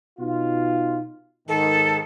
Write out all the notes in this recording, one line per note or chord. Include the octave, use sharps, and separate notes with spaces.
B2 D#4 F4
G#2 D#3 A4